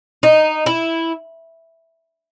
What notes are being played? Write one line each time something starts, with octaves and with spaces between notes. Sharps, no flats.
D#4
E4